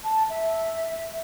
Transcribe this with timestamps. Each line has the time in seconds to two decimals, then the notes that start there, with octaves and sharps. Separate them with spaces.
0.04 A5
0.30 E5